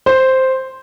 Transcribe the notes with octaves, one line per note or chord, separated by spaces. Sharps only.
C5